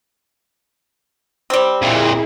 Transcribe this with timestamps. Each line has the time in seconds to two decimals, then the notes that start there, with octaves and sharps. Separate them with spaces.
1.50 G3 C4
1.82 F2 A#2 E4 G#4